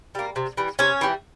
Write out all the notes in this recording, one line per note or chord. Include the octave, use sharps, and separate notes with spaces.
G3 A#3
C3
E3 G3
C3 C#4 C#5
E3 G3